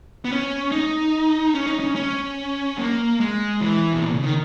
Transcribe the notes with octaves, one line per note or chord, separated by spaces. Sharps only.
B3
C#4
D#4
C#4
D#4
C#4
C#4
A#3
G#3
E3
B2
A#2
C#3
D#3